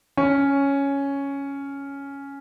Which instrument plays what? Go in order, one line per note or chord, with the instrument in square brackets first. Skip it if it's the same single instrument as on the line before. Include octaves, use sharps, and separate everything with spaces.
[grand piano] C#4